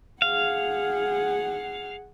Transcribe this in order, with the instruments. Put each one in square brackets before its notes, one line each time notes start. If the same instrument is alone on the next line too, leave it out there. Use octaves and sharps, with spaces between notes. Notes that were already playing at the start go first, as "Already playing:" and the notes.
[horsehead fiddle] G#4 F#5 [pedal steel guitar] F5